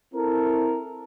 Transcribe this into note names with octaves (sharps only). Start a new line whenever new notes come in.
C4 E4 A4 A#4